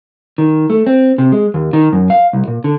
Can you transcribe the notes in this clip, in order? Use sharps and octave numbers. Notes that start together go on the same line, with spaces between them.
D#3
A3
C4
C3
G#3
D#2
D#3
F#2
F5
C2
A#2
D3